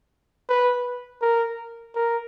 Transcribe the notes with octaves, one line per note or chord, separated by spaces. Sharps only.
B4
A#4
A#4